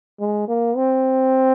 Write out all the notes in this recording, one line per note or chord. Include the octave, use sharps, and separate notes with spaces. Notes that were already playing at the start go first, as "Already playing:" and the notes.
G#3
A#3
C4